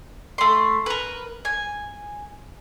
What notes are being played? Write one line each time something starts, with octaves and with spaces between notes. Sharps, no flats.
A3 C6
A#4 B4
G#5